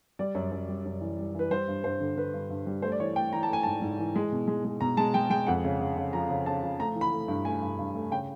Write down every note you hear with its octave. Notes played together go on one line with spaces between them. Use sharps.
G3 D5
F#2
F#2
G3
F#2
E3
G3
E3 B4
G3 C5
G2
G2 C5
D3
D3 B4
G2
G2
G3
A3 C5
D5
E3 C#5
A3 G5
E3 A#5
A5
A3 G#5
G#2 A5
G#2
E3
G#3
B2
G#3
G#3
B2 A#5
G#3 A5
G#3 G5
G#3 G5
F2 F#5
C#3
C#3
C#3
F3 A#5
C#3
C#3 A5
F3
A3 A#5
E3
B5
A3
G2
A3 G#5
G2
G2
A3
C#3 G5